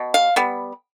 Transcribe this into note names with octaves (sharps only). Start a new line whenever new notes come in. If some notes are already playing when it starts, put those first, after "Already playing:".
Already playing: B2
F5
G3 B3